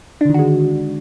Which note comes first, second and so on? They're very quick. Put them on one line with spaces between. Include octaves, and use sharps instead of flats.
D4 D3 D#3 F#4 G#3